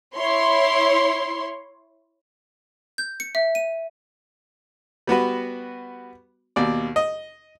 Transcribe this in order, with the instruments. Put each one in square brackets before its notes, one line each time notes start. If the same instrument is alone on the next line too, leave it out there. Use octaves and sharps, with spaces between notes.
[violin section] E4 C#5 C6
[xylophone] G6
C#7
E5
D#7
[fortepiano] G3 B3 F#4 B4
D#2 B2 D5
D#5